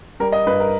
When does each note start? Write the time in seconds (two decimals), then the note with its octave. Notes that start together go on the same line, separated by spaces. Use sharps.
0.20 G3 A#4
0.32 D#5
0.47 G2 B4
0.60 A#4